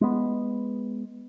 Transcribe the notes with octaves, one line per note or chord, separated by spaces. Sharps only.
G#3 B3